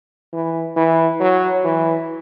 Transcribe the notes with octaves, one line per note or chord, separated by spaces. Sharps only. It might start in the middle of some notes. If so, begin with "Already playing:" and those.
E3
E3
F#3
E3